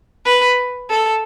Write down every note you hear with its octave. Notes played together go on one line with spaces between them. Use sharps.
B4
A4